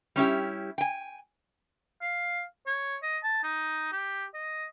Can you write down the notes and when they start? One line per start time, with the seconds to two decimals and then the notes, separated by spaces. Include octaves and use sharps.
0.16 G3 C#4 E4 G4
0.78 G5 G#5
2.01 F5
2.67 C#5
3.03 D#5
3.23 A5
3.43 D#4
3.92 G4
4.34 D#5